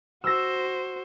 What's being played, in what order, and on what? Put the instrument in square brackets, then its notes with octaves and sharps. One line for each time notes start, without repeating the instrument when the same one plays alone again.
[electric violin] F#4 C5 [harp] E6 A#6